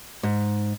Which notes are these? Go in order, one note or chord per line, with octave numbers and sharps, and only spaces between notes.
G#2